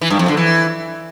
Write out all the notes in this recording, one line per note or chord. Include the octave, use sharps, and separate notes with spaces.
E3
G2
F2
D3
E3